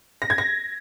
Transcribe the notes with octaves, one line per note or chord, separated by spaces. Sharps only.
A#6
G#6
A#6